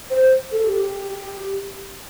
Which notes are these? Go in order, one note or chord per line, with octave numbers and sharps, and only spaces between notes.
C5
A4
G4